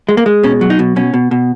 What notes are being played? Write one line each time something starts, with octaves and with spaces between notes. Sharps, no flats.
G#3
A#3
G#3
B2 C#4
F#3
D#4
B2
B2 C#4
B2
B2